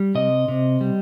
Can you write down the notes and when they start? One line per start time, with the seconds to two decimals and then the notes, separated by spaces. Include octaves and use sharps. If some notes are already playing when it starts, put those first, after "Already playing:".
Already playing: G3
0.15 C3 D#5
0.48 C3
0.81 G3